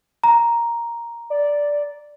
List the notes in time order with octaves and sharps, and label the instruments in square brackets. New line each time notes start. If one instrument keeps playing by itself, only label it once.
[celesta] A#5
[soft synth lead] D5